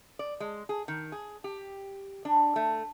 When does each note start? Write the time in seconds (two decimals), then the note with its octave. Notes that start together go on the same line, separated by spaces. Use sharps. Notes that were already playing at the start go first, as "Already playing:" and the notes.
0.19 D5
0.40 G#3
0.69 G#4
0.88 D#3
1.12 G#4
1.44 G4
2.25 D4
2.56 A3